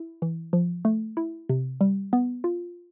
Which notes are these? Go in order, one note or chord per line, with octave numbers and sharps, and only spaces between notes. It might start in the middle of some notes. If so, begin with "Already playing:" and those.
Already playing: E4
E3
F3
A3
E4
C3
G3
B3
F4